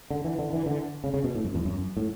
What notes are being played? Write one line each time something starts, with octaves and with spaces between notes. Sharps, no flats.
D3
E3
D3
E3
D3
C#3
C#3
B2
A2
F#2
E2
F#2
A2